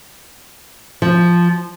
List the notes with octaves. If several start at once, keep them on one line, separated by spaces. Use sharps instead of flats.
F3